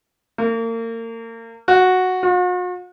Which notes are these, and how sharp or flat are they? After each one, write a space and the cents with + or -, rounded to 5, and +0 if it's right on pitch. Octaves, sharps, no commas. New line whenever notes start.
A#3 -35
F#4 -5
F#4 -45